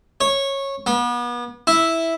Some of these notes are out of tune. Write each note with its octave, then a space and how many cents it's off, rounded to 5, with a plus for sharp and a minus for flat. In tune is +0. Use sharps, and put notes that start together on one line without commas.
C#5 -15
B3 -35
E4 -5